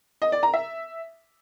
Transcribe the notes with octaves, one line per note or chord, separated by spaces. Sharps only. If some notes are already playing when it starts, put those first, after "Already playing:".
D#5
D5
A#5
E5